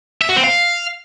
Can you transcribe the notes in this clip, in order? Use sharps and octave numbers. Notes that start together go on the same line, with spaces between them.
E5
F#4
C4
F5